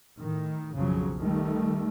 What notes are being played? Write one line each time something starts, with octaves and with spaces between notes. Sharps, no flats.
A2 D#3
B1 F2 C#3 F3 F#3
D#3 G3 A3